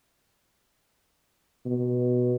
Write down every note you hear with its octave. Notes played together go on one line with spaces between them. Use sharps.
B2